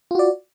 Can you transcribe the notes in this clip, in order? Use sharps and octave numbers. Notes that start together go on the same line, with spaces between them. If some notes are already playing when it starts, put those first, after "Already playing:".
F4 F#4 D5